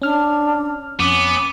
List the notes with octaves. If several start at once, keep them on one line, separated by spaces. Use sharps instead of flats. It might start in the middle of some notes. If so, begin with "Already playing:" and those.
C#4 D4 F6
F2 B3 C#4 D6